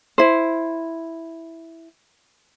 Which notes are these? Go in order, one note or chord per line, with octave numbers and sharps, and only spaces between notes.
E4 C5